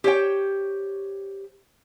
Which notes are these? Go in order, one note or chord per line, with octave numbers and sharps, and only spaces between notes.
G4 C5 C#5 G5